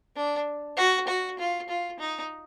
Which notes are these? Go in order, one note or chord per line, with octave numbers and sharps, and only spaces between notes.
D4
F#4
F#4
F4
F4
D#4